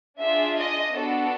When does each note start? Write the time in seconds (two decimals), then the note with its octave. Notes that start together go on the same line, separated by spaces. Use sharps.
0.18 D4 F4 G#4 E5
0.57 D#5
0.94 B3 D4 F#4 A4